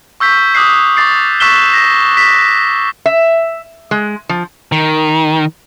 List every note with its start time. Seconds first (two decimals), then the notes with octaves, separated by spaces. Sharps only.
0.20 C#6 E6 G6 B6
0.55 D6 D#6 F#6 C7
0.97 C#6 D6 A6 C7
1.40 C#6 E6 F#6 B6 E7 G7
1.74 A#6
2.17 B6
3.06 E5
3.91 G#3
4.29 F3
4.72 D#3